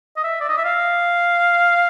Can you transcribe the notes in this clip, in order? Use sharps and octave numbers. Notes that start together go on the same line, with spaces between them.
D#5
E5
D5
D#5
E5
F5